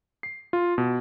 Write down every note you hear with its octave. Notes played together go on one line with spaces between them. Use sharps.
C7
F4
B2